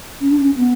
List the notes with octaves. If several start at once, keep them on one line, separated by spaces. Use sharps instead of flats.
C#4
D4
C#4
B3